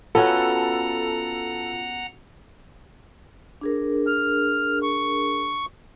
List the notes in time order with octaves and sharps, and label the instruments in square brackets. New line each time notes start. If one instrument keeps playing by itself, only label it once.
[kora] B3 C#4 F#4 [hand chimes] F4 [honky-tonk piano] A4 [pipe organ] F#5 A#5
[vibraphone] D4 G#4 A#4
[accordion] F6
C#6